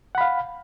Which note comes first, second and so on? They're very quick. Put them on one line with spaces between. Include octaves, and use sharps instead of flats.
F#5 B5 F5